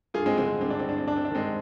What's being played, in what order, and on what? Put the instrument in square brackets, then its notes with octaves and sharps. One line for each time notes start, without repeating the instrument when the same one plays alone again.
[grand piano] G2 F4 G#4
G#3 C4
D3 G#3 C4
G2 C4
D4
C4
G2 D4
C4
G2 D4
C4
D4
D#3 G#3 C4